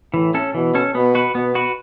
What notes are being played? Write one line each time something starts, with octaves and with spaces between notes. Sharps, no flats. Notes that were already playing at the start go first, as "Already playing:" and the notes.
A2 E3
C#4 A4
B2 E3
C#4 A4
B2 B3
F#4 B4
B2 B3
F#4 B4